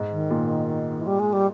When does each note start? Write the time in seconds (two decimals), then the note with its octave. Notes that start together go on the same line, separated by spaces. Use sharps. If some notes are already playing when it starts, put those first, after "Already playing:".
Already playing: G#2
0.11 D#3
0.30 A#2
1.01 E3
1.07 G3
1.20 G#3
1.33 G3